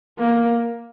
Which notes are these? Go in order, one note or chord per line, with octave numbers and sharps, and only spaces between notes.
A#3